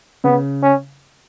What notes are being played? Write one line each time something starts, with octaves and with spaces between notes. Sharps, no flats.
C#3 B3
C#4